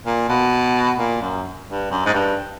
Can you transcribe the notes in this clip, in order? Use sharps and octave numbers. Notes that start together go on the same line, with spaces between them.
A#2
B2
A#2
F#2
G2
F#2
G#2
G2